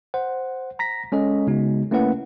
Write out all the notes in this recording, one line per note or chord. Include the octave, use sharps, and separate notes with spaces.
C5 F#5
A#5 A#6 B6
G#3 C#4 A4 D#5
C#3 G#3 B3 D#4 F#4
A3 A#3 C#4 E4 B4 F#5